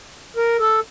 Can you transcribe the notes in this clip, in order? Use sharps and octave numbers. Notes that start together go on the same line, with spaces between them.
A#4
A4